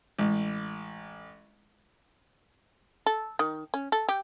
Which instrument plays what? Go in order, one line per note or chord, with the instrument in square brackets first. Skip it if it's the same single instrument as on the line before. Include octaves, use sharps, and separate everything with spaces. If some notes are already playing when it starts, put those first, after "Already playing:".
[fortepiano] A1 [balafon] G#3
[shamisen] A4
D#3
C#4
A4
G4